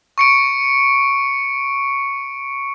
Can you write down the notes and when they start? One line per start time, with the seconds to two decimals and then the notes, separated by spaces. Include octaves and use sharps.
0.18 C#6 C#7 D7